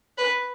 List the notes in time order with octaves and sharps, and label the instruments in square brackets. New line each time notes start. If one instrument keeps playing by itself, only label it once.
[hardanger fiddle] B4